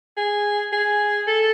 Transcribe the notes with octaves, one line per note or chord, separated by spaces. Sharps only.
G#4
G#4
A4